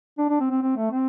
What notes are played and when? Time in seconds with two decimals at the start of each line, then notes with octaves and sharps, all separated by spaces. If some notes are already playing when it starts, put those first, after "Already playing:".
0.18 D4
0.29 D4
0.40 C4
0.50 C4
0.62 C4
0.76 A3
0.91 C4